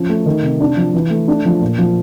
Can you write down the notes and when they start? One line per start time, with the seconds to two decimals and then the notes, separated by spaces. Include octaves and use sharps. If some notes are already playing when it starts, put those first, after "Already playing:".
Already playing: F3 C#4
0.09 A3
0.26 D#3
0.43 C3
0.60 D4
0.77 F3
0.95 E3
1.10 A3
1.28 D4
1.45 F3
1.61 A#2
1.79 F3